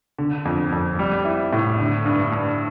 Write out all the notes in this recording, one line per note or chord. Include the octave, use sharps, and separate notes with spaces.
D3
F2
F2
G3
E4
A2
D3
G2
G2